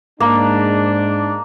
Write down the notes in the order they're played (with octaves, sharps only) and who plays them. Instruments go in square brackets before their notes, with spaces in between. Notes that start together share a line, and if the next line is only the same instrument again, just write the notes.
[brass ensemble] G#2 G#3 D4 [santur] A#3